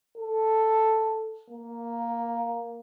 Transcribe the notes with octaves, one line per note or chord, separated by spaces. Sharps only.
A4
A#3